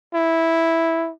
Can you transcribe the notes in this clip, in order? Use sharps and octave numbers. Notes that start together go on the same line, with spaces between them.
E4